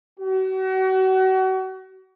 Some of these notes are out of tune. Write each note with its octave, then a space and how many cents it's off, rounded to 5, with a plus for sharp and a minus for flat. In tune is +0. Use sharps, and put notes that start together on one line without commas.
F#4 +35